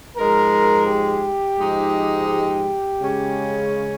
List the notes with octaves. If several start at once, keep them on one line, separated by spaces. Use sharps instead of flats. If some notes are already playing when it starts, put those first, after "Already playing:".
G#2 F3 G#3 A#4
G4
G#2 F3 G#3 D#4
G4
C#3 G#3 C#4